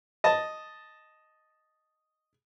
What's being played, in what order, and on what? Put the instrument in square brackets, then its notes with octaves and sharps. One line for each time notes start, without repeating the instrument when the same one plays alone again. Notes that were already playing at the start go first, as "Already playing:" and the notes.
[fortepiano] D#5 A5